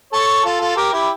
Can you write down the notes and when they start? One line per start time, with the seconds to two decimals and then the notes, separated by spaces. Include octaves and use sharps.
0.13 A4 C#5
0.44 F4 A4
0.61 F4 A4
0.77 G4 A#4
0.93 E4 G4